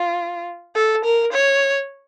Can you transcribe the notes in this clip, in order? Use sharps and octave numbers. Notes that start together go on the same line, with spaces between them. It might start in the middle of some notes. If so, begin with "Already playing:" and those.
Already playing: F4
A4
A#4
C#5